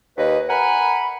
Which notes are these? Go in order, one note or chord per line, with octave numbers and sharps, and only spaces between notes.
D#2 B4 D#5
A#4 F#5 G#5 B5